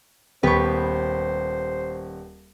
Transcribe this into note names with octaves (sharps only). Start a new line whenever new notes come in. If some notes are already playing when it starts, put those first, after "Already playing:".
D#1 B3 G4 B4 C5 C#6